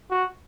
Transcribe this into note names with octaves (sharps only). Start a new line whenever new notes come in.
F#4